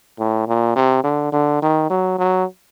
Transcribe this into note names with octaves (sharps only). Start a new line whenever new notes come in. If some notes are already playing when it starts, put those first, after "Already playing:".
A2
A#2
C3
D3
D3
D#3
F#3
F#3